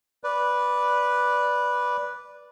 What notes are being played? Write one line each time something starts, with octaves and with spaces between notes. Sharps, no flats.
B4 D5